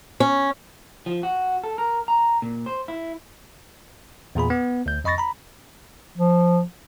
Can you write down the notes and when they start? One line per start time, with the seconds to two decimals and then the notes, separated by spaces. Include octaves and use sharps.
0.20 C#4
1.06 F3
1.23 F#4
1.64 A4
1.78 A#4
2.08 A#5
2.42 A#2
2.66 C5
2.88 E4
4.35 E2 A#2 G#4 B5
4.50 B3
4.86 D2 G6
5.04 F2 D#5 B5 C#6 A6 A#6
5.18 A#5 B5
6.16 F3